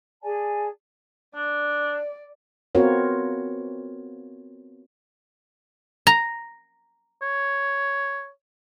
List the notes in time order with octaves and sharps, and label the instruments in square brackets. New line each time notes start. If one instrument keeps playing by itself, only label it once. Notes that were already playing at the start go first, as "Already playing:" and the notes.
[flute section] G#4 D5 G#5 A5
[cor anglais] D4 [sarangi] D5
[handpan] B3 C4 F4 F#4 A#4 C#5
[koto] A#5
[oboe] C#5